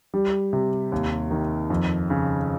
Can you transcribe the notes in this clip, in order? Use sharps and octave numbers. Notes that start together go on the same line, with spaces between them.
G3
C3
D#2
D#3
F2
C#3